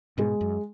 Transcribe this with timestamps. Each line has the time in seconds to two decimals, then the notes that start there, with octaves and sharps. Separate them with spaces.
0.18 G#2 B2 G#3
0.41 F#2